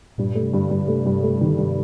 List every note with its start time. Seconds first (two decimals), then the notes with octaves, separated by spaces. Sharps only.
0.18 G2 A#2
0.35 A3
0.42 C3
0.53 G2 D3
0.71 G2
0.88 C3 A3
1.06 G2
1.23 A3
1.41 D#3
1.47 D3
1.58 G2 C3